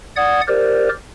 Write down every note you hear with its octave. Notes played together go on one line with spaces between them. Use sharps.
D5 F#5 D#6 G#6
G4 A#4 C5 D5